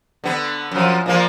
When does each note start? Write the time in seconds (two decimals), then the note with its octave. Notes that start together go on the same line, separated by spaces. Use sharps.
0.24 D3 B3
0.72 F#2 F3
1.06 A#2 F3 A#3